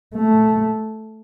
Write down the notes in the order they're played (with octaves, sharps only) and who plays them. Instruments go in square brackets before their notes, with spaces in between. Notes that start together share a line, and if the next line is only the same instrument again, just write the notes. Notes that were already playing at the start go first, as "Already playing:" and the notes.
[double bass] A3